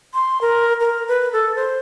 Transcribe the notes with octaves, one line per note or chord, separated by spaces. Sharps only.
C6
A#4
A#4
B4
A4
C5